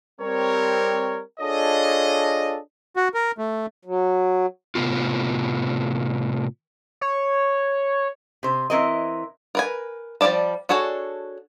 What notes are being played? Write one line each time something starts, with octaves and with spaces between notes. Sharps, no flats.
G3 C4 A#4 C#5
D4 F4 G#4 A4 C#5 D#5
F#4
A#4
A3
F#3
A2 C3 B3 F4
C#5
C3 C5
E3 C4 E4 A#4 C5 D#5
A#4 B4 G#5
F3 G3 A#3 D5 A5
D4 F#4 G#4 A4 C#5